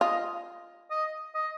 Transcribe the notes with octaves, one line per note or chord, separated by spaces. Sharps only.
F4 D#5
D#5
D#5